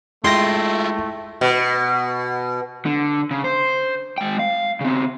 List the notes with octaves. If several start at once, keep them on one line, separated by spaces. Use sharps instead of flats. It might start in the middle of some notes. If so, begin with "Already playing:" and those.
G#3 A3 E4 F4 G5 C6 A#6
B2
D3
C#3
C5
G#3 G5
F5
C#3 C4